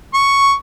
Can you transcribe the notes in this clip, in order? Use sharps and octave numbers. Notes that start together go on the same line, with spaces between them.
C#6